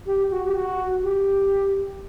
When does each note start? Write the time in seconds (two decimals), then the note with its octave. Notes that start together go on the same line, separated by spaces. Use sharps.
0.06 G4
0.31 F#4
0.46 G4
0.55 F#4
1.03 G4